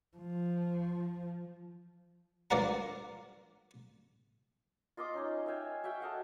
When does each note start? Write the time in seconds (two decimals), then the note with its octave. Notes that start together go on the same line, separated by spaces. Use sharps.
0.17 F3
2.50 G2 F3 A#4 D5 F#5 A#5
4.97 F4 D#5 C6 D6
5.14 C#4 D#4 C#5
5.46 E5 F5 G5 G#5
5.84 F#4 E5 F5 G5
6.00 A4 D#5 F5 F#5